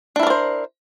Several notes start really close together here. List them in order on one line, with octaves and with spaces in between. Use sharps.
D4 E4 A#4 D5 C5